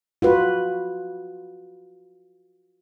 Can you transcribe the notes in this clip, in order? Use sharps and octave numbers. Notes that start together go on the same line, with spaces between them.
F4 F#4 B4